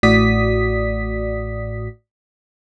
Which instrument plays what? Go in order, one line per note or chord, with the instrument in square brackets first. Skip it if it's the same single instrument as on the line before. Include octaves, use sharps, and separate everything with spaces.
[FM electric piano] A1 A2 F#4 D5 D#6 B6